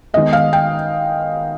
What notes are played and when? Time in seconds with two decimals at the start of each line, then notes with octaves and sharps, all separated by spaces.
0.14 D#3 G#3 B3 D#5
0.33 F5
0.53 G5